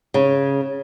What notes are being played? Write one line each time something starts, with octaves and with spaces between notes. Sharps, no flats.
C#3